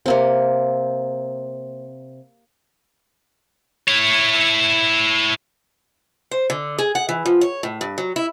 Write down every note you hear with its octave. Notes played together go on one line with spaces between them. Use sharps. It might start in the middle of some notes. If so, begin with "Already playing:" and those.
C3 A#3 C4
E4 C#5
C5
D3
G#4
F#5
E3
F3
C#5
A2
G2
F#3
E4